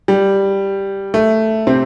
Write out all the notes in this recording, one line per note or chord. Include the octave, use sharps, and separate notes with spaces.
G3
A3
C3 C4